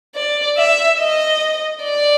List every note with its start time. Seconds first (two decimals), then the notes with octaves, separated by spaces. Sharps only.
0.15 D5
0.58 E5
1.00 D#5
1.84 D5